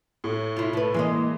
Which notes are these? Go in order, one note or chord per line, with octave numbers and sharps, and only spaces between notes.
A2
E4 F4
A3 B4
E3 G#3 A#3 D#5